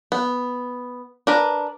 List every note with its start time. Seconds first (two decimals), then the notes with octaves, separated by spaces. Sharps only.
0.12 B3
1.27 D4 A#4 B4